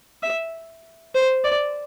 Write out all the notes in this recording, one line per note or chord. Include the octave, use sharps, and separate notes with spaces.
E5
C5
D5